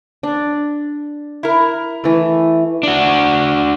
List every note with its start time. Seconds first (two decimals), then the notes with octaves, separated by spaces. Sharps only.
0.23 D4
1.43 E4 A#4
2.04 E3 A3
2.83 D4 F#4